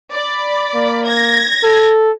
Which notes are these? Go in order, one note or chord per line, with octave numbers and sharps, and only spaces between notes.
D5 B5
A#3
G#6 A#6
A4